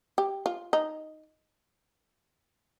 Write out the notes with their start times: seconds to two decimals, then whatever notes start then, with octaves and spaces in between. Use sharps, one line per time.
0.18 G4
0.46 F4
0.73 D#4